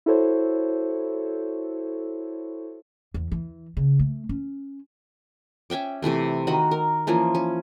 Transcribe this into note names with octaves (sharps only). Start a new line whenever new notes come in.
E4 F#4 A4 C5 C#5
E2
E3
C#3
A3
C#4
C#4 E5 G5 D6
C3 E3 A3 C4
D#3 F#4 D#5 B5
A#4
E3 F3 A#3 C#4
C#4